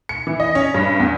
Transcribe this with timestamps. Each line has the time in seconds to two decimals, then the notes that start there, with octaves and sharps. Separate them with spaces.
0.09 C#7
0.27 E3
0.40 D#5
0.55 C#4
0.74 G2
1.00 E2